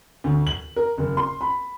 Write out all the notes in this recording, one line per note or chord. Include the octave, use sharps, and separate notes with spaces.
D2
F#7
A#4
F#1
C6
B5